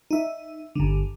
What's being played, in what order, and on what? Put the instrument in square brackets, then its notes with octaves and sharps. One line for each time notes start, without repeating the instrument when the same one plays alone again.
[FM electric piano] D#4 E5
G1 D3